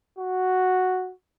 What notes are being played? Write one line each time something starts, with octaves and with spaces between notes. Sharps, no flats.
F#4